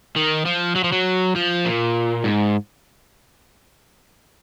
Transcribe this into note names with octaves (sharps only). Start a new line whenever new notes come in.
D#3
F3
F#3
F3
F#3
F3
A#2
G#2